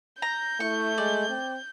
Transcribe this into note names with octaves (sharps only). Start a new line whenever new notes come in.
A#5 G6
A3 E4 C#6
G#3 D5
C4